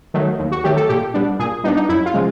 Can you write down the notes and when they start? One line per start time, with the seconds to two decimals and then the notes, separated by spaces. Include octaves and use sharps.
0.14 D#3 F#3 A3
0.39 D#2
0.52 F#4
0.64 D#3 F#3 A3 G4
0.76 A4
0.89 A#2 G4
1.14 G3 B3 D4
1.39 A#2 G#4
1.64 G3 B3 D4 D#4
1.76 D#4
1.89 F#2 E4
2.06 F4
2.14 C#3 F3 G#3